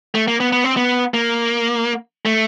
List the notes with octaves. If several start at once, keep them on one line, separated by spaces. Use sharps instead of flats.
A3
A#3
B3
B3
C4
B3
A#3
A3